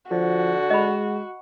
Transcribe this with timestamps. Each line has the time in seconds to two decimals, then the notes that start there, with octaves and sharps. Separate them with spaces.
0.11 D3 F3 F#4
0.70 G#3 D#5 B5